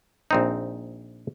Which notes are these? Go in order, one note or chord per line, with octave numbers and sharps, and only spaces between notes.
A#1 C4 D#4